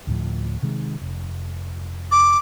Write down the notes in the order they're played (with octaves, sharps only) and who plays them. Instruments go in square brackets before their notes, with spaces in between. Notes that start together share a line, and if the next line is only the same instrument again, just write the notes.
[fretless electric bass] D2 A2 F3
C3 D#3 G#3
F1
[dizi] D6